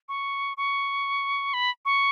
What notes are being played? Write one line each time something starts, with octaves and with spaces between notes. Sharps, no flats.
C#6
C#6
B5
C#6